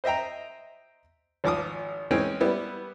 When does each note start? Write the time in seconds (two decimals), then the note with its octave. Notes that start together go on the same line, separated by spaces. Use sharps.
0.04 C5 D#5 E5 G5 A#5
1.44 G#1 F3 D6 D#6
2.11 E3 G#3 C4 C#4 C#5
2.41 G3 B3 E4